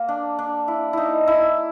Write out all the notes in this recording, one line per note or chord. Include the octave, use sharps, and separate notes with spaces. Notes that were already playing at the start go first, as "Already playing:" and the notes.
Already playing: A#3
D4
D4
E4
D#4 E4
E4